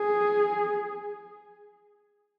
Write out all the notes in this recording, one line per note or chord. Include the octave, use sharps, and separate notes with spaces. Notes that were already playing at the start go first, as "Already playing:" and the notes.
Already playing: G#4